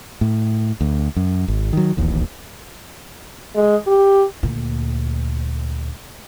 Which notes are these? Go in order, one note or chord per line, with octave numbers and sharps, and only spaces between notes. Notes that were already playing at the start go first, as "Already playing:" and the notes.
A2
D2
F#2
G#1
D#3 F#3
D1 A1 D#2
G#3
G4
D2 A#2